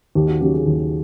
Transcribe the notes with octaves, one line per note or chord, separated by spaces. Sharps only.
D#2 G4
F#4
C#3 F#3 G4
G#4
D#2